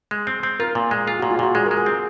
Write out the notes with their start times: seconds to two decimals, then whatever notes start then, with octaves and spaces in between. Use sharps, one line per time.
0.11 G#3
0.27 C4
0.43 C4
0.60 F4 A#4
0.75 A#2
0.91 G#3
1.07 F4 G#4
1.20 A#2 F#4
1.31 F4
1.39 A#2 F#4
1.55 G#3 G#4
1.66 A#4
1.71 G#3
1.77 G#4
1.86 C4